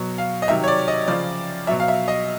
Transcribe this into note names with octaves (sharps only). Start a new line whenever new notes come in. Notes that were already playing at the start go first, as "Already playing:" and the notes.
Already playing: B2 F#3
F5
D#5
C3 D#3 F#3 E5
C#5
D5
D#5
C#3 F3 D5
B2 F#3 E5
F5
E5
D#5